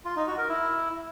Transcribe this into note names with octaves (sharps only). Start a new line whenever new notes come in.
F4
D#4
F#4
A#4
E4